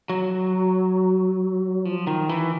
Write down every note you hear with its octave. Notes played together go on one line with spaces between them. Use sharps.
F#3
F3
D#3
E3